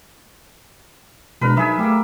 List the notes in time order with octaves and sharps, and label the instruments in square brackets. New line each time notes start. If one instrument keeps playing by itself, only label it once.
[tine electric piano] B2 G#3 D4 [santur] A#4 B4
[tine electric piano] F#3 D#4 B5 [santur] G#4 E5
[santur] G3 A#3 [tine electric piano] A3